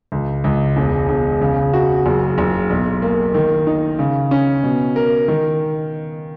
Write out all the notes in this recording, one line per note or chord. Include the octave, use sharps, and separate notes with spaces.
C#2
C#2
E1
E1
C#3
F#4
F#1
F#1
B1
A#3
D#3
D#4
C#3
C#4
B2
A#4
D#3